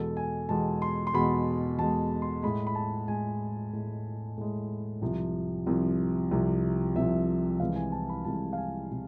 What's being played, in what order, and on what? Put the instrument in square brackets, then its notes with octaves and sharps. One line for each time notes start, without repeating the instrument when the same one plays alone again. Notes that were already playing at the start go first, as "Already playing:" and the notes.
Already playing: [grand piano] E2 B2 G#3 A4
G#5
E2 B2 G#3 A5
C6
C6
E2 B2 G#3 B5
E2 B2 G#3 A5
C6
A2 G#3 B5
B5
A5
A2 G#3 G#5
A2 G#3
A2 G#3
C2 C3 F3
C2 C3 F3
C2 C3 F3
C2 C3 F3 E5
C2 C3 E3 G#3 F5
G#5
A5
B5
C2 C3 E3 G#3 A5
F5
G#5
C3